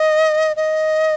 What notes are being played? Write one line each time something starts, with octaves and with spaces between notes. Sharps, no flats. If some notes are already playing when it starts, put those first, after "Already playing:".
Already playing: D#5
D#5